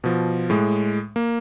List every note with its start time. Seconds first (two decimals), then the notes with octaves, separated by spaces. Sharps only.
0.04 B2 F3
0.50 A2 G#3
1.16 A#3